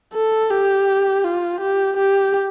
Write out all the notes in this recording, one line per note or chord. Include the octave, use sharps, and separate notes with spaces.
A4
G4
F4
G4
G4